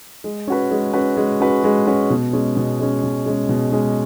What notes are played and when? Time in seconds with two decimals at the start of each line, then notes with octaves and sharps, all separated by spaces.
0.24 G#3
0.47 C#4 F#4 B4
0.71 G#3
0.93 C#4 F#4 B4
1.17 G#3
1.40 C#4 F#4 B4
1.64 G#3
1.87 C#4 F#4 B4
2.10 B2
2.33 G#3 C#4
2.57 B2
2.80 G#3 C#4
3.03 B2
3.26 G#3 C#4
3.49 B2
3.72 G#3 C#4